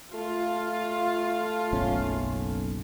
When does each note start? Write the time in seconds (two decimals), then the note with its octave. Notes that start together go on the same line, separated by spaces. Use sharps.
0.14 A3 F4
1.73 F#1 B1 C#4